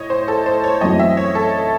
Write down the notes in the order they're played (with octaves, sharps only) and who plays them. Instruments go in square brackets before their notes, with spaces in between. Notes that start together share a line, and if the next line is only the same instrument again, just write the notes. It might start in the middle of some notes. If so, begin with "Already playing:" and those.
Already playing: [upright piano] A2 [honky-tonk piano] C#5 D#5
[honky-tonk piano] C5
A4
C5
C#5
[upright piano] F#2 E3 A3 C4 F#4 [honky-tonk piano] D#5
[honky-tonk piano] E5
C#5
A4